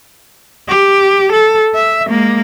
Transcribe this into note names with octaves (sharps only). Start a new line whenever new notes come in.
G4
A4
E5
G#3 A#3